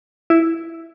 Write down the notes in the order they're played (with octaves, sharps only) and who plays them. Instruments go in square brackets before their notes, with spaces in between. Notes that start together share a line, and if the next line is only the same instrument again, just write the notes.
[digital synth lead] E4